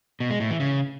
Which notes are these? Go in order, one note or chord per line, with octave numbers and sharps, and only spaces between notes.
B2
G#3
A2
E3
C#3